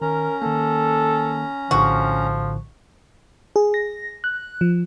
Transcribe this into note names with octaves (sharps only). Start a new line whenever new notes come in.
D#3 C#4 A#4 A#5
D#3 A#3 A4
A#1 A2 D3 F3 F#4
G#4
A#6
F#6
F3